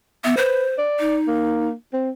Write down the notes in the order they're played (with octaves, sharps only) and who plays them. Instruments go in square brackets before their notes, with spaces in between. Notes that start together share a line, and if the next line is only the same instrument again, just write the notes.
[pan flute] B3 [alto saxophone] E5
[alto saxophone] B4 [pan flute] C5
[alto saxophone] D5
[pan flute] D#4
[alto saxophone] A#3
C4